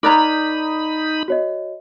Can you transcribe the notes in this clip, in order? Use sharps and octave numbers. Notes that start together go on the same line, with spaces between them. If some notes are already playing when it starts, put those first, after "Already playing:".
D#4 A#4 D5 A#5 B5 D6 F#6 G#6
F#4 C#5 D#5